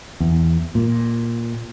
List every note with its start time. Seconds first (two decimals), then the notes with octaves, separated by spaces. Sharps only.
0.20 E2
0.75 A#2